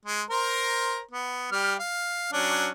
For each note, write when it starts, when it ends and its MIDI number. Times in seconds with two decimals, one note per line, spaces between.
0.06 0.22 56
0.30 1.00 70
0.30 1.00 72
0.30 1.00 82
1.11 1.51 59
1.52 1.75 55
1.52 1.75 67
1.52 1.75 89
1.79 2.28 77
2.32 2.69 54
2.32 2.69 61
2.32 2.69 62